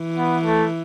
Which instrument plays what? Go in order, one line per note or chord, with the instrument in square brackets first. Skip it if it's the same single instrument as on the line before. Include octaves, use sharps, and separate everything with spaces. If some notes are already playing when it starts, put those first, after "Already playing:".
Already playing: [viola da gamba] E3
[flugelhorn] B3
A3